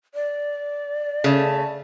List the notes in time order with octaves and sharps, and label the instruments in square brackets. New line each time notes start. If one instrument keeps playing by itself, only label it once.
[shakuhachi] D5
[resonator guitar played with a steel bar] C#3 A3